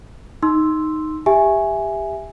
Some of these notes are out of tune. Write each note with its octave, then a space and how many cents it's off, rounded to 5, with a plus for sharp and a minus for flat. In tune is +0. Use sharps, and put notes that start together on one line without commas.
D#4 +0 C6 +0 E6 +0
G4 +20 E5 +0 G#5 +0